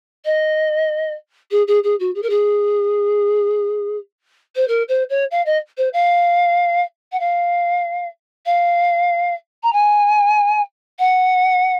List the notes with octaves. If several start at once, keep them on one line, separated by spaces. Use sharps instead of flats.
D#5
G#4
G#4
G#4
F#4
G#4
A#4
G#4
C5
A#4
C5
C#5
F5
D#5
C5
F5
F#5
F5
F5
A#5
G#5
F#5